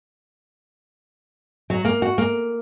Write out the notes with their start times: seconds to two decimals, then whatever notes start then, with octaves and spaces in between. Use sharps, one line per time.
1.70 F#3
1.85 A#3
2.02 F#4
2.18 A#3